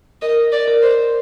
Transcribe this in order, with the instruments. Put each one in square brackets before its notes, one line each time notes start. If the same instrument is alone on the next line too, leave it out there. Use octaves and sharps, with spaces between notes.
[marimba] A#4 [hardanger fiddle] D#5
[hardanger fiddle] D5
[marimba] A#4
[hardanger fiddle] C5